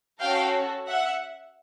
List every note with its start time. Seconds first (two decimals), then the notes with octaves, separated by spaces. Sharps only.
0.20 C#4 F#4 A4 F5 G5
0.88 E5 F#5